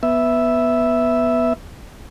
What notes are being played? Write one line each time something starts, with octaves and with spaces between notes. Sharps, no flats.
B3 E5